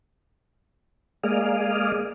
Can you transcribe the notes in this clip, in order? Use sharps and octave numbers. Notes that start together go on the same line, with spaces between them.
G#3 A#3 G#4 D5 D#5 F5